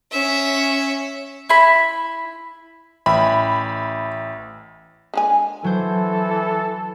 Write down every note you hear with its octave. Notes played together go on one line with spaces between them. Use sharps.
C#4 E5
E4 B5
A1 E5 G5 B5
D3 G#3 G#5
E3 F#3 A4 C5